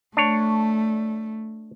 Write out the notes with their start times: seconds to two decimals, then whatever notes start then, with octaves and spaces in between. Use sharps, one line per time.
0.17 A3 D4 C#5